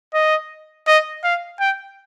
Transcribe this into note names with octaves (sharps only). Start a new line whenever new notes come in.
D#5
D#5
F5
G5